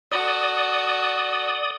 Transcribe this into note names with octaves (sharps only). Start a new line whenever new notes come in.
F#4 A4 D5 D#6